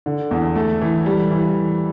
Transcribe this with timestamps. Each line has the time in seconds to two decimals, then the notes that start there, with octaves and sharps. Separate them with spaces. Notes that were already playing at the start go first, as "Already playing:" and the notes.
0.06 D3
0.31 E2
0.56 A3
0.81 E3
1.06 G3
1.31 E3